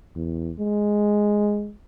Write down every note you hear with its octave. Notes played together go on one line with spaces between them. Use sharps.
E2
G#3